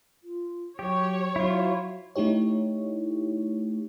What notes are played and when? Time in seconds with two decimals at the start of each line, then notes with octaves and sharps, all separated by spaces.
0.24 F4
0.79 F#3 G4 C#5
1.36 F#3 E4 F4
2.16 A3 D#4 E4 G4 C#5